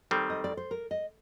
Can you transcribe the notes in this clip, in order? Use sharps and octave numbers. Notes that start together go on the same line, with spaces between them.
D#3 G3 C4 A4
D#5
D5
C5
A#4
D#5